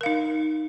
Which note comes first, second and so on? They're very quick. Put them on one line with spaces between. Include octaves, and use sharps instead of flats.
A#4 F5 D#4